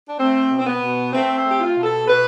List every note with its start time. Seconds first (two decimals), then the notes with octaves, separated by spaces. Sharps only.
0.09 D4
0.19 A3 C4
0.50 B2
0.59 C4
0.67 B3
0.82 B2
1.13 A3 C4
1.37 C4
1.45 A3 G4
1.60 F4
1.76 B2
1.83 A4
2.08 B2 B4